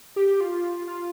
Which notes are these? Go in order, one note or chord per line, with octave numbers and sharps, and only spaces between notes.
G4
F4
F4